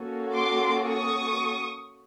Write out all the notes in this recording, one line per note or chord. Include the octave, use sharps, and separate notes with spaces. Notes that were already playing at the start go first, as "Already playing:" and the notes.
Already playing: A#3 C#4 F#4 A4
C6 D6
C#6 D#6